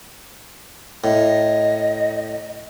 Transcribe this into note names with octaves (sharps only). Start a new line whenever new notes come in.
A2 D#5